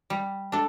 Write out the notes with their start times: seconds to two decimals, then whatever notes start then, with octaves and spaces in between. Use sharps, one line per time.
0.10 G3
0.52 D4 A4